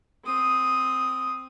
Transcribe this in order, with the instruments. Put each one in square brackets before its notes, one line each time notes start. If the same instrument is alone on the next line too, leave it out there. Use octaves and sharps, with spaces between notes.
[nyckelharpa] C4 D#6